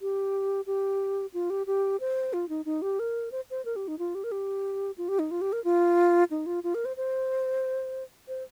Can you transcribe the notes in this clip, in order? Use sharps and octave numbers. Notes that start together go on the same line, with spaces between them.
G4
G4
F4
G4
G4
C5
F4
D#4
D#4
G4
A#4
C5
C5
A#4
G4
D#4
F4
G4
A#4
G4
F4
G4
D#4
F4
G4
A#4
F4
D#4
F4
F4
A#4
C5
C5
C5